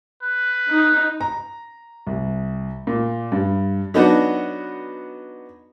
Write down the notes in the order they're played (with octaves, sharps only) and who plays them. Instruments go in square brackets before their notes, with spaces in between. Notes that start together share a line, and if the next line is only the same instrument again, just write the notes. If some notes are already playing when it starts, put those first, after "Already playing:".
[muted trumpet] B4
[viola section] D#4
[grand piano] A#5
C2
A#2
G2
[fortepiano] F#3 B3 D4 D#4 F#4